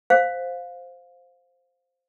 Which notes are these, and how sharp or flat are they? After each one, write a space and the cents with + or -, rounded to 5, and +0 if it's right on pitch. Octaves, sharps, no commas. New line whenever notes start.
C5 +0 F5 +15